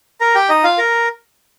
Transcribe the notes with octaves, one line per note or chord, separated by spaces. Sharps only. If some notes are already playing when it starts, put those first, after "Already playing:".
A#4 A#5
G4 G5
D#4 D#5
F4 F5
A#4 A#5